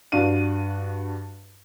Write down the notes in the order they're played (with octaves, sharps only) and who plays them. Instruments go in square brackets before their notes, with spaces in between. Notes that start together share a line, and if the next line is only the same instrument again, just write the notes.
[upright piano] G2 D4 F#4 F5 D#7